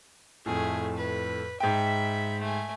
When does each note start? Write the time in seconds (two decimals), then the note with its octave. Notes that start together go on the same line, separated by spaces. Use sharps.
0.46 F2 A2 A3 G#4
0.97 B4
1.60 G#2 E5 G5 B5
2.40 A3 G#5